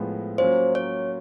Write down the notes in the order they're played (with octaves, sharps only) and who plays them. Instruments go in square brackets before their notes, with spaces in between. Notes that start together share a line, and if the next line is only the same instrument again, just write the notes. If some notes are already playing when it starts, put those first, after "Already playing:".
Already playing: [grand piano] A2 F3 G#3 B3
[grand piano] F#3 A#3 C#4 F4 [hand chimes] C5
[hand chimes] C#5